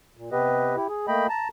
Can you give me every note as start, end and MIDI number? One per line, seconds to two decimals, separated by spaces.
0.17 0.30 46
0.32 0.76 48
0.32 0.76 59
0.32 0.76 67
0.32 0.76 71
0.32 0.76 75
0.76 0.87 64
0.76 0.87 67
0.89 1.06 68
1.08 1.27 57
1.08 1.27 58
1.08 1.27 75
1.08 1.27 79
1.08 1.27 83
1.29 1.48 81
1.29 1.48 82